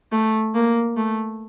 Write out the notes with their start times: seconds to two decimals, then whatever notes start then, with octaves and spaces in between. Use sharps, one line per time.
0.12 A3
0.55 A#3
0.97 A3